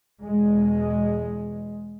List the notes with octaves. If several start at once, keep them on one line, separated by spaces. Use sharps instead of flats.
E2 B2 G#3